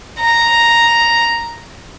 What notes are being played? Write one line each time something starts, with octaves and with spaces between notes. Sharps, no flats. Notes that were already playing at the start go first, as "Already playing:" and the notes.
A#5